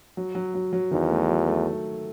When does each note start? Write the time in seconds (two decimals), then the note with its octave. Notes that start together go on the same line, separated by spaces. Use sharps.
0.17 F#3
0.35 F#3
0.54 F#3
0.73 F#3
0.91 E2 D#3
1.10 A3
1.29 F#3
1.48 A3